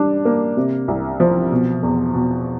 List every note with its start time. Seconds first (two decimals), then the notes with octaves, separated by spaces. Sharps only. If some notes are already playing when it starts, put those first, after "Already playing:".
Already playing: G3 D4
0.25 A#3
0.57 C3
0.88 C2
1.20 F3
1.52 B2
1.83 E2
2.14 B2